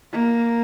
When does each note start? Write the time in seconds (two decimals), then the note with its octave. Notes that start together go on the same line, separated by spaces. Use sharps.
0.13 A#3